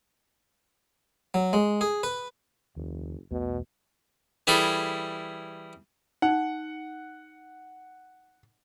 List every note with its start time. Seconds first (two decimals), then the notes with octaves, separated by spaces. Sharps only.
1.34 F#3
1.53 G#3
1.81 G#4
2.03 B4
2.76 F#1 D#2
3.31 B1 E2 B2 A3
4.47 E3 G3 E4 G#4 A4
6.22 D#4 F#5